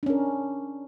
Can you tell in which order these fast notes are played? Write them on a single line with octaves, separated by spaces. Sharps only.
D4 C#4 A#4